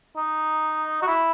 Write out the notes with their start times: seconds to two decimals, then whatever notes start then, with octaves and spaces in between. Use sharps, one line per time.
0.17 D#4
1.02 F#4
1.07 E4